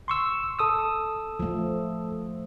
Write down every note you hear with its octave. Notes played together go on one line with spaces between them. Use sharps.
C6 C#6 E6
A4 D#6 E6
F3 A3